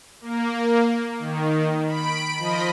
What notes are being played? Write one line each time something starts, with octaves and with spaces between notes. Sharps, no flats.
A#3
D#3
B5 D7
F3 D#5 B5